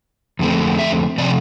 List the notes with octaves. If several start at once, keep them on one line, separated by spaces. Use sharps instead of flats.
F2 D3 A3 C4
E5
C3 F3 C4 D5